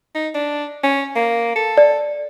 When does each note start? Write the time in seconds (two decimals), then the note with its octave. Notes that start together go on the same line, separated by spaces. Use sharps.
0.15 D#4
0.35 D4
0.83 C#4
1.16 A#3
1.56 A4
1.78 D5